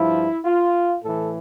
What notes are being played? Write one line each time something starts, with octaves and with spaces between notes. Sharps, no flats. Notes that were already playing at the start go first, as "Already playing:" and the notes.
Already playing: G2 F3 E4
F4
A2 E3 A4